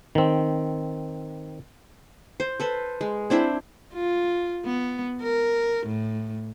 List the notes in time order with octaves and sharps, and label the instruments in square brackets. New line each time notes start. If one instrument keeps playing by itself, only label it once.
[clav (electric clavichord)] D#3 C4
[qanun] C5
A4 B4 C5
G#3
C4 D4 E4 C5
[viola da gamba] F4
B3
A#4
A2